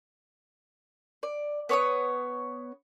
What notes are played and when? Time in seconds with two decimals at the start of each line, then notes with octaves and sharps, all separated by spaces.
1.23 D5
1.69 B3 C#5 D6 D#6